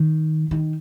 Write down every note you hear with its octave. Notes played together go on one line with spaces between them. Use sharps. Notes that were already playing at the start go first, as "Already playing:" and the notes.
Already playing: D#3
D#3